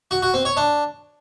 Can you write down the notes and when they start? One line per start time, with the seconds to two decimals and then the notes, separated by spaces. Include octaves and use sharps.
0.11 F#4
0.22 F#4
0.34 C4
0.45 C#5
0.57 D4